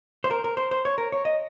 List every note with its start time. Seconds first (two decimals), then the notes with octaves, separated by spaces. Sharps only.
0.24 C5
0.31 A#4
0.44 A#4
0.57 C5
0.71 C5
0.85 C#5
0.98 A#4
1.12 C#5
1.25 D#5